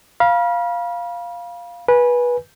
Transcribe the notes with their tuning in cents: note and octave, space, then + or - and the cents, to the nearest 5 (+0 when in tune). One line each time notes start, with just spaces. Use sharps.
F5 +0 B5 -40
B4 -20 G#5 +0